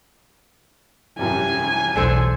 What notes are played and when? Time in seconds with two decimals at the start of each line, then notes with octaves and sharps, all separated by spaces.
1.19 C2 F#2 G3 G#5
1.96 B1 E2 D4 A4 C5